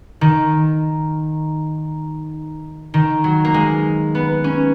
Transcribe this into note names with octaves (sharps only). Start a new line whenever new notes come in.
D#3
D#3
F#3
A#3
G#3
B3
C#4